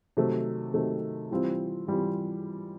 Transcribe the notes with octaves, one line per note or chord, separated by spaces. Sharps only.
C3 D#3 F#3 A3
C3 D#3 F#3 A3
E3 G3 C4 F4
E3 G3 C4 F4